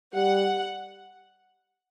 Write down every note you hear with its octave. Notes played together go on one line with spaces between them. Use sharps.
G3 F#5